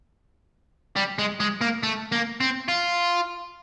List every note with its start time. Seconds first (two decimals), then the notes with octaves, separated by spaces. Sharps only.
0.97 G3
1.19 G#3
1.40 G#3
1.61 A#3
1.83 A3
2.12 A#3
2.41 C4
2.68 F4